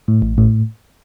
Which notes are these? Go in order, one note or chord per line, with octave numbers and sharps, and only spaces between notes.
A2
A1
A2